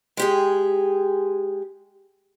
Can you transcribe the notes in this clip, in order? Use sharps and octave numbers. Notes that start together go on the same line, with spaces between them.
G#3 G4 G#4